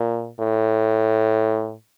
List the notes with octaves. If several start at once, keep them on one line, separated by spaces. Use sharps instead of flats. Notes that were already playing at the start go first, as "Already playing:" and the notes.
Already playing: A#2
A2